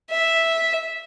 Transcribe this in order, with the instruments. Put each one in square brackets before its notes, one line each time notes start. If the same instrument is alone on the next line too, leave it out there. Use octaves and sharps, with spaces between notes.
[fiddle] E5